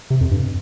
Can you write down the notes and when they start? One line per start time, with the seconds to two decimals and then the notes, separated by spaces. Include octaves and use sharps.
0.10 C3
0.21 F2
0.31 G2